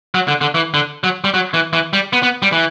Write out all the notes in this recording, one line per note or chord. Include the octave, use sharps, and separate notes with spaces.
F#3
D3
D3
E3
D3
F#3
G3
F#3
E3
E3
G3
B3
B3
G3
E3